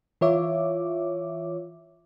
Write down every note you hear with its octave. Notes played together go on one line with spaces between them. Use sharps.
E3 F4 C#5 E5 D6